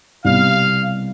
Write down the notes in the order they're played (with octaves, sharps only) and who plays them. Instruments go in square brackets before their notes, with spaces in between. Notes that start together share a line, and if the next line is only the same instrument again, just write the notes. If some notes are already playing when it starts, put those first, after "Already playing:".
[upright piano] C2 B2 G3 [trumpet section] F5